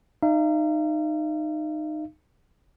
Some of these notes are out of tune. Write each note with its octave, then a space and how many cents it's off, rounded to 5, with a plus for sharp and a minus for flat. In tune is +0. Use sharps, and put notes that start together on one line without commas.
D#4 -20 F5 -45